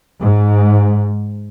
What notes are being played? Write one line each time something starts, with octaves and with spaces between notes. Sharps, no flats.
G#2